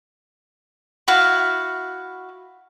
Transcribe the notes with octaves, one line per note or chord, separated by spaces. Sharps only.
E4 F#4 F5